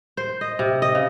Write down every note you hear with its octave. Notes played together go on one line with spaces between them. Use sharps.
C5
D#5
C3
D#5
C#3